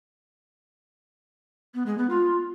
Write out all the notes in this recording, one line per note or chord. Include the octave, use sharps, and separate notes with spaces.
B3
G#3
B3
F4